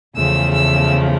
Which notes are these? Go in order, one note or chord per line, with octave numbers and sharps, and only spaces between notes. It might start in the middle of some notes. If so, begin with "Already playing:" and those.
E2 C#3 F3 A3 E6
E6